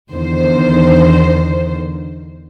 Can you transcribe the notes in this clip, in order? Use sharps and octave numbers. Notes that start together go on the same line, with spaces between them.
E2 D3 D#3 C5